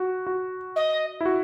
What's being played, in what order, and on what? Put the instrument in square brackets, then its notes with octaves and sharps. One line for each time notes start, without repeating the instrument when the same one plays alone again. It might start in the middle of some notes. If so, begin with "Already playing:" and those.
Already playing: [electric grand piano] F#4
F#4
[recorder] D#5
[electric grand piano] E4
F#4